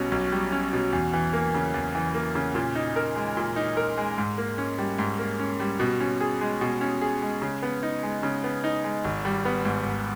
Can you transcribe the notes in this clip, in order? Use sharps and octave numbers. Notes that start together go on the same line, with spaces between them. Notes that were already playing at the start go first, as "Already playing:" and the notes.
Already playing: B1 B2 G3 C#4
B1
G3
C#4
B2
E2
E3
A#3
C#3
E2
E3
A#3
C#3
A#2
D#4
A#4
G#3
A#2
D#4
A#4
G#3
G#2
A#3
C#4
G3
G#2
A#3
C#4
G3
B2
C#4
G#4
G#3
B2
C#4
G#4
G#3
C#3
B3
D#4
G#3
C#3
B3
D#4
G#3
G#1
G3
B3
G#2
G#1